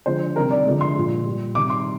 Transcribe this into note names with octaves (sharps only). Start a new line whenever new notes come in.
D3 F3 G#3 C5
C3 D#3 G3 A#4
D5
D3 F3 G#3
C6
A#2 F3 G#3
A#2 G3
C3 D#3 G3 D6
C6